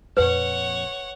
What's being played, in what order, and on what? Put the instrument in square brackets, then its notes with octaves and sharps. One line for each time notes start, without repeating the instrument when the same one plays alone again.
[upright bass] F2 A#2 [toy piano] B4 [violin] C#5 F#5